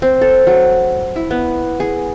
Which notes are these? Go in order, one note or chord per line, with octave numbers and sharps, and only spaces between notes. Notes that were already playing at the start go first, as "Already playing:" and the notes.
C4
A4
F#3
E4
B3
G#4